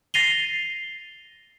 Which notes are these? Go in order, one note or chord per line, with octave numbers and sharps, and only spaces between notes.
A6 A#6 C7 D#7 F7 G7